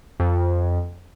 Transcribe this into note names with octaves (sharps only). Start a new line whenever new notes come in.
F2